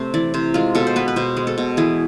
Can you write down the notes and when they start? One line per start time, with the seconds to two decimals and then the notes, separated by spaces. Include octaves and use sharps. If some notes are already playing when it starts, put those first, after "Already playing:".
Already playing: C3 A3 C4 C5
0.14 E3 D5
0.34 C3 C5
0.54 G#3 F4
0.75 B2 A4
0.87 C5
0.96 B3 B4
1.08 B4
1.16 B2 C5
1.37 G#3
1.47 A4
1.58 B2
1.77 E3 G#4